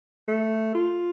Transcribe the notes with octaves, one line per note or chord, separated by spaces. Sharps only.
A3
F4